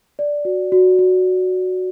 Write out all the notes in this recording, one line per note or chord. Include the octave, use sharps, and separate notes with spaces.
D5
F#4
F#4
F#4